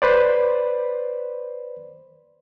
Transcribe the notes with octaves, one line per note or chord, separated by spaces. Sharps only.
B4 C5 D5